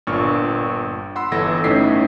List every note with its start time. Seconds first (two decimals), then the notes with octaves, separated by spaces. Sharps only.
0.07 G1 A#2 D4 C#6 F6
1.16 F#5 B5 C6 E6
1.32 G1 E3 E4 A4 A#6
1.64 G1 A2 C#4 D#4 B6 C7